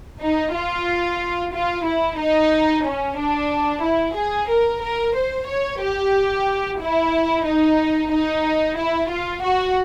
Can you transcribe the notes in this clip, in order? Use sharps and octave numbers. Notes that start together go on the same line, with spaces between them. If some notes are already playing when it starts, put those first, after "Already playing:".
D#4
F4
F4
E4
D#4
C#4
D4
E4
G#4
A#4
A#4
C5
C#5
G4
E4
D#4
D#4
E4
F4
F#4